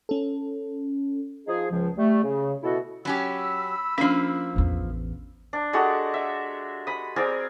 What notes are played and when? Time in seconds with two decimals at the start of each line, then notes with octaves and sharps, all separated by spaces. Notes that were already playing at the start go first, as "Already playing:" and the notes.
0.09 C#4 A4
1.47 F3 D#4 G#4
1.71 C#2 F3
1.97 G3 A3
2.23 C#3
2.63 B2 E4 F#4 A4
3.05 F#3 C#4 G4 B5 E6
3.98 F3 A#3 C#4 D4
4.56 A1 E2
5.53 D4
5.73 G#3 F#4 G4 A4
6.14 E5
6.87 B5 D#6
7.16 C4 G#4 A#4 D5